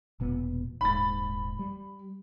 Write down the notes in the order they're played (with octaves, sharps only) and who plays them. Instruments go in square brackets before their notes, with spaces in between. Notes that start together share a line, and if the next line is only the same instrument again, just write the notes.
[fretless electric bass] E1 A#2 B3
[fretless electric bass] D#1 G#2 [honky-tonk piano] B5 A6
[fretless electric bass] G3